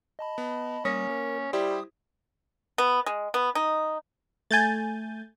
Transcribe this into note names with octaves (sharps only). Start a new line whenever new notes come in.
D#5 A5 B5
B3
G3 A#3 C#4 D#6 A#6
A#4
G3 E4 G4 C5 D#6
B3
G#3
B3
D#4
A3 G#5 G6 A6